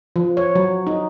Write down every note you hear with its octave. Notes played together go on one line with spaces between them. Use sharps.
F3
C#5
F#3
D#4